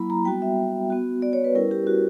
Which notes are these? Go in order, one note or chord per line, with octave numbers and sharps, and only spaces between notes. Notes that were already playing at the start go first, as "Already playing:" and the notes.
Already playing: F#3 A#3 E4 B5
A#5
G3 B3 F#4 G5
E5
B3 F#4
D5
C#5
B4
G3 C#4 E4 A#4
G4
F#4